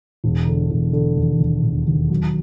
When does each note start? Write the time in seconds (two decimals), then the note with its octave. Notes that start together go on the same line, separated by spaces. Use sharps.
0.24 E1
0.47 D3
0.71 E1
0.93 D3
1.17 D#2
1.40 D#2
1.63 E1
1.87 D#2
2.10 F#3